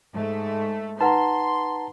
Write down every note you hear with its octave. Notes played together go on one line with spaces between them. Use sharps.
G#2 A3
D#4 B4 F#5 A5 A#5 C6